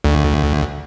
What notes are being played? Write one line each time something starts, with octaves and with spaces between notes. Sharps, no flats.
D2